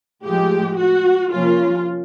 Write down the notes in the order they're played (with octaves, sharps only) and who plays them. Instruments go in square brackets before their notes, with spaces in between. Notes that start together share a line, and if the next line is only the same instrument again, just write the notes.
[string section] A2 F3 G#3 [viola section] G4
[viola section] F#4
[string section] C3 F3 A#3 C#4 [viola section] F4